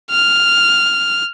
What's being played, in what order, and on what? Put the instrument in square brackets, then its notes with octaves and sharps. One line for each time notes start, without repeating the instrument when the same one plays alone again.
[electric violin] F6